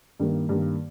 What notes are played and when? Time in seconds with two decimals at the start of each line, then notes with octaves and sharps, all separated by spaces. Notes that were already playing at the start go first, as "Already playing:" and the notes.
0.20 G2 D#3 A#3
0.49 G2 D#3 A#3